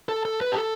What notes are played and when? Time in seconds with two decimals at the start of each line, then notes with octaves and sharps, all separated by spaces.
0.09 A4
0.25 A4
0.41 B4
0.52 G4
0.56 A4